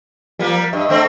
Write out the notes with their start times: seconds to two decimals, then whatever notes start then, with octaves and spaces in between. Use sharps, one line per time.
0.39 F3 G3 A#3
0.73 G2 D#5 E5
0.89 D3 A3 C4